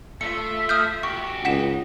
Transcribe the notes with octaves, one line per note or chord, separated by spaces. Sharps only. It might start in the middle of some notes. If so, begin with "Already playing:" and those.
A3 F4 E5 C#7
D#6 F6 G6
F#4 G4 C#6
C#2 D#4 F#5 B6 E7